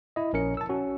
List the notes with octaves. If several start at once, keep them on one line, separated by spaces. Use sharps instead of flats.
E4 D#5
A#1 C#4 A#4 C#7
A5 E6
C#4 F#4